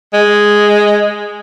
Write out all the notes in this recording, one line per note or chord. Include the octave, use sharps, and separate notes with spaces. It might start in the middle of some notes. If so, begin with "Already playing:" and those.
G#3